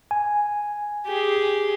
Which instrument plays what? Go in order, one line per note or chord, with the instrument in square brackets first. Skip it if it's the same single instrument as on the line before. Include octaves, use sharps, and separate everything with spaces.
[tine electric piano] G#5
[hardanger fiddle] G4 G#4